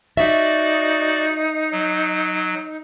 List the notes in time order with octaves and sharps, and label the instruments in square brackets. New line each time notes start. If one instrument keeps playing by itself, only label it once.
[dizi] D#4 [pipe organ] F#4 D5 [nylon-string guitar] E5
[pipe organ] F#3